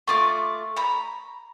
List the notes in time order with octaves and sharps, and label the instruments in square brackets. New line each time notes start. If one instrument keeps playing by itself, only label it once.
[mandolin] A3 F4 D6 [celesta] C#6
[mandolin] A#5 B5